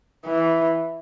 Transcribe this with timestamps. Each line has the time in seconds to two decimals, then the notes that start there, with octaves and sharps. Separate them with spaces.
0.26 E3